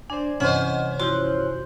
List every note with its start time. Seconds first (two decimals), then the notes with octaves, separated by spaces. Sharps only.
0.10 D4 C5 D5 G#5
0.40 G2 C3 E3 C#4 C5 D#5 F#5
1.00 F3 E4 F#4 C6 F#6 G6